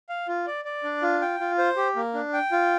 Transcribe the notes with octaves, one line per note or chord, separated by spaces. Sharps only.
F5
F4
D5
D5
D4
F4
G5
F4
C5
G4
A#3
D4
G5
F4